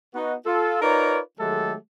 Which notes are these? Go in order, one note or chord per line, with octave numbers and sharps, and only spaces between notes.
B3 D#4 F#4
F4 A4
D#4 F4 A#4 B4 C#5 D5
D#3 F#3 G#3 A3 G4 A4